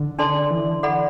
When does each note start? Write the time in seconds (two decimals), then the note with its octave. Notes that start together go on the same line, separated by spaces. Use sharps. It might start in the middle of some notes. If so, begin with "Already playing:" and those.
Already playing: D3
0.19 D4 A4 D5 A5 C6
0.51 E3
0.83 A4 D5 F#5 B5